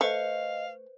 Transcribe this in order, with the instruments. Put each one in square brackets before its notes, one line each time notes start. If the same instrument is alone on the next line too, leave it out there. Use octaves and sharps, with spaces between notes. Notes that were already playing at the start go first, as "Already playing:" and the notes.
[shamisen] A3 [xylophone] B4 C5 C#7 [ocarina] D#5 [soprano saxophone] F5